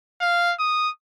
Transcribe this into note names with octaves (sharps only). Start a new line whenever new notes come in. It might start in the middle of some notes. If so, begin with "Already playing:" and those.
F5
D#6